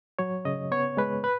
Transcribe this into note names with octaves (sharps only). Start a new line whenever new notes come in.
F#3 C#5
C#3 D#5
B3 C#5
G#3 B4
B4